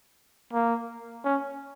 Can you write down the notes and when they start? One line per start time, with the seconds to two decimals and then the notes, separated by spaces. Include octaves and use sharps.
0.53 A#3
1.25 C#4